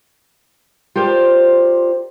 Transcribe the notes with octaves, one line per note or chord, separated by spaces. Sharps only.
F4 G4 A#4 C5 D5